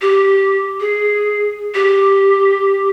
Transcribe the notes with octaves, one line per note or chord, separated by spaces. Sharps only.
G4
G#4
G4